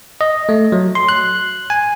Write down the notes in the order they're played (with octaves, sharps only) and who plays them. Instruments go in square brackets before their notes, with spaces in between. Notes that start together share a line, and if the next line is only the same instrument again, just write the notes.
[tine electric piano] D#5
A3
F#3
C6
F#6
G#5